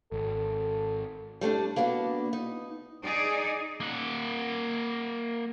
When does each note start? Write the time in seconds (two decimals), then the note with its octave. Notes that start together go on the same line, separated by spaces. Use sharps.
0.12 G#1 A4
1.41 G3 A3 C#4 D4
1.76 A#3 B3 D4 F#4
2.33 D#4
3.04 D#4 G#4 D5
3.80 A#3 F#5